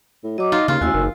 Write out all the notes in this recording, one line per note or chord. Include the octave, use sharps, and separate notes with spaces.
A2
F#3 D#5 D6
D#4 F4
D#2 C#3 F4
A1 D#2 F#4 G#5 E6
F#1 D#3